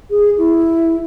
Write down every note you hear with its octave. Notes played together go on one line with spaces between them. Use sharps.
G#4
E4